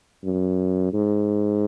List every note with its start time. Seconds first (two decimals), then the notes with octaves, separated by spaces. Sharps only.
0.24 F#2
0.93 G#2